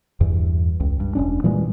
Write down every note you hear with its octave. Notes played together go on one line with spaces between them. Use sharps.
E2 G2 E3
C#2
G2
E1 C#4 D4
A#2 E3 G3 G#3